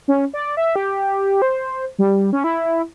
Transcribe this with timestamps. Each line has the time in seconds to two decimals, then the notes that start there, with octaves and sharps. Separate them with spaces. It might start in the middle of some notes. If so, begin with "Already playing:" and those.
0.08 C#4
0.34 D5
0.57 E5
0.76 G4
1.42 C5
1.99 G3
2.33 C#4
2.44 E4